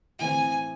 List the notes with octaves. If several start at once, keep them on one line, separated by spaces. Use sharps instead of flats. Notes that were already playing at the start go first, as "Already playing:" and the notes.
A2 E3 C4 G#5